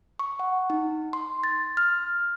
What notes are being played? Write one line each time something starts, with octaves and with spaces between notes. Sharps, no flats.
C#6
F#5
D#4
C6
A6
F6